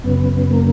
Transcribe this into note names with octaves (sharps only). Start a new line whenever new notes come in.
F#2 C#3 B3
A#3